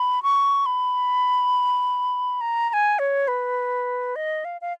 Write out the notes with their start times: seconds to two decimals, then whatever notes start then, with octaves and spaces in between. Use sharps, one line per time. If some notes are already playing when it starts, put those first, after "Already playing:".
Already playing: B5
0.23 C#6
0.66 B5
2.41 A#5
2.70 A#5
2.73 G#5
2.99 C#5
3.28 B4
4.16 D#5
4.45 F5
4.61 F5